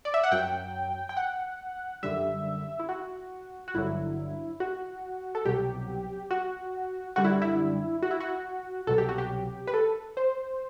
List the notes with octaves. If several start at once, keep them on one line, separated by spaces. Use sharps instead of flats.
D5
E5
F#5
F#2 F#3 G5
G5
F#5
F#2 D3 G3 E5
E4
F#4
F#4
G1 G2 D3 F#3 E4
F#4
A4
C2 B2 F#3 G4
F#4
F#2 D3 G3 F#4
E4
E4
F#4
E4
F#4
C2 B2 F#3 A4
G4
F#4
G4
B4
A4
C5